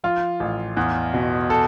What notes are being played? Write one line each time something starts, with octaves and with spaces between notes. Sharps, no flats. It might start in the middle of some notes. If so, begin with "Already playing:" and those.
F3 F4
A1
E2
B2
A4